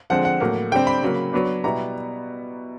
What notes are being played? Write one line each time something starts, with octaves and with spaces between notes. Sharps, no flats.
D3 F3 G#3 C4 F#5
F#5
A2 F#3 A#3
D3 G3 C4 G5
B5
C#3 F#3 A#3
F#3 B3 D4
B2 G3 B3 E4 A#5